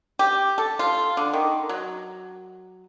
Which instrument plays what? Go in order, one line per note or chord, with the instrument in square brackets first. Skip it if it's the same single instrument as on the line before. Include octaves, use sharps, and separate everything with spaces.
[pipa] G4
A4
F4
D3
D#3
F#3